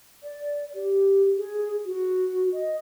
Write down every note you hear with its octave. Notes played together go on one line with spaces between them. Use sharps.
D5
G4
G#4
F#4
D#5